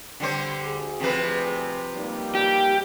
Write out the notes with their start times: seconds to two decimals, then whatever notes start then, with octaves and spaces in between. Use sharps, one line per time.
0.20 D3 G3 C5
0.64 D2 G#4
1.00 C3 F3 B4
1.95 G3 A#3 D#4
2.35 G4